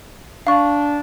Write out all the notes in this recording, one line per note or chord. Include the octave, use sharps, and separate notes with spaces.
D4 F5 C#6